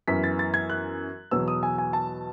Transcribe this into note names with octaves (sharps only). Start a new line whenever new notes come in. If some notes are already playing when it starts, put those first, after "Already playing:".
F#2 E3 B3 B6
A6
A6
G#6
F#6
E2 B2 F#3 B3 E6
D#6
G#5
G#5
A5